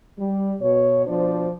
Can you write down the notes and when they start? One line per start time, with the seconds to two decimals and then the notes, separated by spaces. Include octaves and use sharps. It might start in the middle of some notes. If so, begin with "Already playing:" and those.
0.18 G3
0.61 B2 C#5
1.07 B2 F3 D4 C5 D5